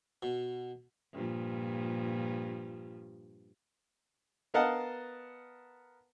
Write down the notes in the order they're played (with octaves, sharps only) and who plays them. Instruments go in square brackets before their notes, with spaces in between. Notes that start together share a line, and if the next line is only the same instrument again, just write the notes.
[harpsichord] B2
[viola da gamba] G2 A#2 F3
[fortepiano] B3 A#4 D#5 F5 F#5 A5